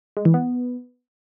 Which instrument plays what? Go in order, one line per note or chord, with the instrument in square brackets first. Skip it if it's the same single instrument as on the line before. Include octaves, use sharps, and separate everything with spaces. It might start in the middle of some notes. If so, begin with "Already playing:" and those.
[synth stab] G#3
E3
B3